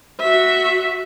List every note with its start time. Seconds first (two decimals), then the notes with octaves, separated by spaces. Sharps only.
0.20 F#4 E5